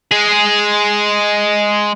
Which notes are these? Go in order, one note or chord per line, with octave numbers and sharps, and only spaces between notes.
G#3 G#4